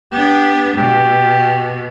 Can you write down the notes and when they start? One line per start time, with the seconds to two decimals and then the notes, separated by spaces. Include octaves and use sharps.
0.12 B3 D4 G4
0.77 B2 G4